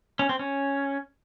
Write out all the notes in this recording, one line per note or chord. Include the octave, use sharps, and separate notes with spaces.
C#4
C4
C#4